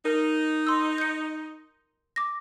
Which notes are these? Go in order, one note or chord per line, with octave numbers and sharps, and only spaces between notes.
D#4 A#4
C6 E6
G6 C#7
D6 A#6